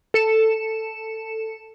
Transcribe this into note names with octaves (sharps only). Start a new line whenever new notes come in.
A4 C#7 E7